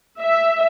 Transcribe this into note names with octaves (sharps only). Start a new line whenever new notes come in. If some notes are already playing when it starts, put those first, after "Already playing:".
E5